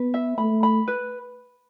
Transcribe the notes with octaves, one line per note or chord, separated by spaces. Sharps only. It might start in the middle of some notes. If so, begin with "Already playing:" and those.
Already playing: B3 B4
E5
A3 B5
B5
B4